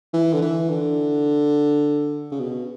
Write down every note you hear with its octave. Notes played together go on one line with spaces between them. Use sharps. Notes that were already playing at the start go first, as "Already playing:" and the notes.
E3
D3
E3
D3
C#3
B2